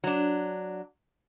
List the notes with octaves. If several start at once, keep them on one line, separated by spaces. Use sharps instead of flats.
F#3 D4